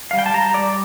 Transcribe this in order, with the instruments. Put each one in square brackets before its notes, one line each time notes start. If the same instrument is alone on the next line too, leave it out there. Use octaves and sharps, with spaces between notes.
[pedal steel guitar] G3 F5
G5
A5
G3 A#5
G3 D5